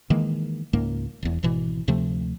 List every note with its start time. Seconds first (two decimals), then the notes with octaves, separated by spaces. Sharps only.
0.10 D#3 E3 G#3 A#3
0.73 C#2 G#2 A#3
1.23 E1 E2
1.43 G#1 B2 E3
1.88 D2 C3 F3 A3